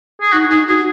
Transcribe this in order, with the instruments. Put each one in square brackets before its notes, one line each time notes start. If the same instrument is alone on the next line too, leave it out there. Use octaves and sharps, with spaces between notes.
[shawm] G#4
[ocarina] D#4 [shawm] F#4
[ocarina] D#4 [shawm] G#4
[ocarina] F#4 [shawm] G#4